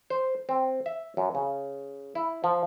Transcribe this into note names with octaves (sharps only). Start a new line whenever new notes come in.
C5
C4
E5
F#2
C#3
E4
F3